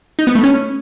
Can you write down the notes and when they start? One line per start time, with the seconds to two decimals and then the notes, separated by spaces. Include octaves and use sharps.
0.19 D#4
0.27 B3
0.35 A3
0.43 C#4